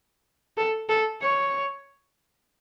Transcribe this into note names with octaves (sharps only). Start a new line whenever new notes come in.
A4
A4
C#5